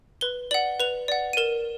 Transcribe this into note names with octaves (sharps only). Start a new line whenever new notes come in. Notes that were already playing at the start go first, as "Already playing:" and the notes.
B4 G7
D5 F#5 F#7
B4 F7
D5 F#5
D#7
A#4 E7